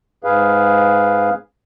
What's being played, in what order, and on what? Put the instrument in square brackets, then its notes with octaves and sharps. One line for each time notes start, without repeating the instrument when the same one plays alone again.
[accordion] G#2 G#4 B4 F5